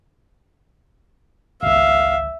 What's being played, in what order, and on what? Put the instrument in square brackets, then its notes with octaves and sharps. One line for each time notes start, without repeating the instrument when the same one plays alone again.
[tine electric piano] G#1 C#2 [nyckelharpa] E5 [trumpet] F5